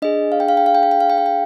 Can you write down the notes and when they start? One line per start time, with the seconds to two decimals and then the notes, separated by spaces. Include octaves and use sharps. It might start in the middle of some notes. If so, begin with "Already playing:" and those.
0.02 D4 G#4 D#5
0.32 F5
0.40 G5
0.49 F5
0.57 G5
0.66 F5
0.75 G5
0.83 F5
0.91 G5
1.01 F5
1.10 G5
1.18 F5
1.26 G5